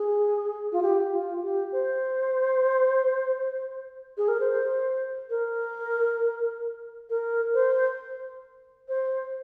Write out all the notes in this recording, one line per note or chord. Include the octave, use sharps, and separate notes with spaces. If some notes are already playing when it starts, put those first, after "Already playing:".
Already playing: G#4
F4
G4
F4
G4
C5
G#4
A#4
C5
A#4
A#4
C5
C5